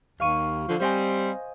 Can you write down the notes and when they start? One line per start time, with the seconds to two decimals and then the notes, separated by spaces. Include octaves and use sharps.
0.20 D#2 F5 C#6 D#7
0.67 D3 F3
0.80 G3 C4 C5 D#5 G#5